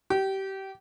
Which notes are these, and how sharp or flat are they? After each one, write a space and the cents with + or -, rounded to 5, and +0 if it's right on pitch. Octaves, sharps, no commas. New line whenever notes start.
G4 -25